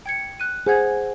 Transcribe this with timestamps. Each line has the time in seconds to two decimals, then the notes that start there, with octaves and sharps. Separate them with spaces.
0.06 G5 G#6 C#7
0.40 F#6 D#7
0.67 G#4 C5 F#5 G#6